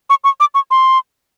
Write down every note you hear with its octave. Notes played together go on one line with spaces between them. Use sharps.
C#6
C#6
D6
C#6
C6